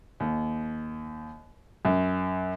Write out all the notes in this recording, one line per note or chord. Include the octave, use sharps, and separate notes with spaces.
D#2
F#2